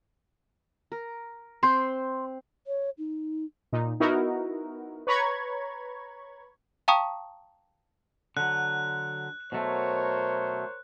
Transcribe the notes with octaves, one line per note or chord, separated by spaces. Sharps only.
A#4
C4 C5 C6 G6
C#5
D#4
A#2 D#4
B3 D#4 E4 F#4 A#4
B4 C#5 A#5 B5 C#6 G#6
F5 G5 A5 A#5 C#6 D#6
D3 F#3 F#6
B2 F#3 A3 A#4 C5 C#5